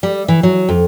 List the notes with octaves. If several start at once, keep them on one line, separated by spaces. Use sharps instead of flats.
G3
E3
F#3
F2